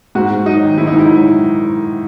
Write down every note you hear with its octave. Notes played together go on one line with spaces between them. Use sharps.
G#2 F#4
G#2
F#3 D#4
D#3
G#2 E4
D#4
G#2
E4
F#3